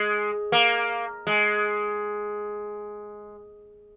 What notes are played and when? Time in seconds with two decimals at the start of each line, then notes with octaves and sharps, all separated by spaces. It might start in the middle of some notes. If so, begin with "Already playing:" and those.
Already playing: G#3
0.52 A#3
1.27 G#3